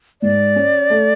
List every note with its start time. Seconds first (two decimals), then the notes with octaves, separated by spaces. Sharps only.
0.22 G#2 D5
0.56 C#4
0.90 A3